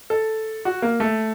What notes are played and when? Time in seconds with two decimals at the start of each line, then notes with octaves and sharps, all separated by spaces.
0.10 A4
0.65 F#4
0.82 A#3
1.00 A3